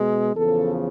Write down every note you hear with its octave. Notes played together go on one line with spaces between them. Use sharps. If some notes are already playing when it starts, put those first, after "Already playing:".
Already playing: B2 G#3
E2 C#3 F3 A4